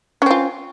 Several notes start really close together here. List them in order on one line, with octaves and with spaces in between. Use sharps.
C#4 C4 F4